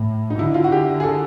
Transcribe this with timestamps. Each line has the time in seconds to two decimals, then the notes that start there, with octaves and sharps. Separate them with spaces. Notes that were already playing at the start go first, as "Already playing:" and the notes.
Already playing: A2
0.30 D#4
0.38 D3 E4
0.54 F4
0.64 F#4
0.72 G4
1.00 G#4
1.04 A4